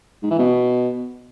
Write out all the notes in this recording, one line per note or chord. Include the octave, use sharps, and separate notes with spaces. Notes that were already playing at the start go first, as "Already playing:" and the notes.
G#2
E3
B2